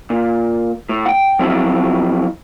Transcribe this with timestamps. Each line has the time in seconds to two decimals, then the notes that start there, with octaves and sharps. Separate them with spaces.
0.10 A#2
0.89 A2
1.06 F#5 G5
1.39 F3 F#3 C4 E4